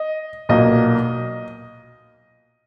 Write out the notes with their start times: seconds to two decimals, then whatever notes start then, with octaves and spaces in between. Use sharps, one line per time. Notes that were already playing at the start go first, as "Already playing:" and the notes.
Already playing: D#5
0.49 B1 A#2 F#3 A#3 D#5